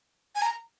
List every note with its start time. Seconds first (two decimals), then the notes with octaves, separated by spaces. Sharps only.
0.35 G#5
0.42 A#5